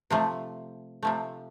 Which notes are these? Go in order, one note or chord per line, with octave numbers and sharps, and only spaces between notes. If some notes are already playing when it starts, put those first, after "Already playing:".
C3 F3 A3
C3 F3 A3